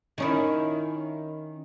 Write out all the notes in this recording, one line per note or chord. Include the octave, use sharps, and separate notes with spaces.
D#3 C#4 E4